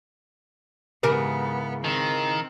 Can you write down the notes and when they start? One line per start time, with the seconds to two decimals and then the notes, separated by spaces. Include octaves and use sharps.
1.03 G#2 C#3 E3 B3 G4 A#4 A#5
1.84 D#3 C4